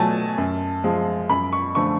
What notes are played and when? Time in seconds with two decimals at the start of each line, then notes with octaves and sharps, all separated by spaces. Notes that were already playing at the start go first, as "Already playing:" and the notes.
Already playing: B2 F#3 A3 G#5 A5
0.38 F#2
0.84 F3 G#3
1.29 F#2 B5
1.52 C#6
1.75 D3 F3 A3 C#6